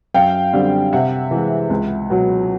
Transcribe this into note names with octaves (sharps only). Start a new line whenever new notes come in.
F#2 F5 G5
D3 G3 C4
C3 E5 F#5
E3 G#3
C#2
B2 F#3